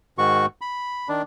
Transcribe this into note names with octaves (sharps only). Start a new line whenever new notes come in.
G#2 D#3 F#4 C#6
B5
D#3 D4